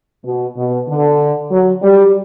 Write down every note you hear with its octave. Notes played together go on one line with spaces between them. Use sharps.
B2
B2
D3
F#3
G3